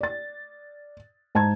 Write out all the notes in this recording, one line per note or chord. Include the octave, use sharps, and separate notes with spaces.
D5 A6
G#2 A5 A#5 G#6